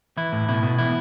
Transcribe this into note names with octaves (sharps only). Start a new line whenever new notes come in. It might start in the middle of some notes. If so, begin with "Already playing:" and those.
E3 E4
A2
B2 E4
B2
E3 E4